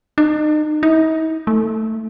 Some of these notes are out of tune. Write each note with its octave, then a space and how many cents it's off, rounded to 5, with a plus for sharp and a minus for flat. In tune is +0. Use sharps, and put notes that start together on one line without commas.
D#4 -35
D#4 +45
A3 +10